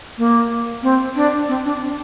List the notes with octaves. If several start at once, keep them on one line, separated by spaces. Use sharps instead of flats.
A#3
C4
D4
C4
D4
D4